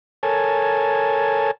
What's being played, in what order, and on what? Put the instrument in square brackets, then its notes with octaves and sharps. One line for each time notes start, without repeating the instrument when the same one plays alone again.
[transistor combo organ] A4 A#4 C#5 G#5 A5